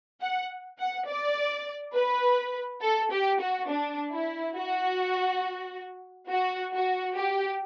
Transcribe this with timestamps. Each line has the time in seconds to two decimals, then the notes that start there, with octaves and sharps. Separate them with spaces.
0.21 F#5
0.78 F#5
1.08 D5
1.95 B4
2.82 A4
3.11 G4
3.40 F#4
3.68 D4
4.12 E4
4.56 F#4
6.29 F#4
6.73 F#4
7.16 G4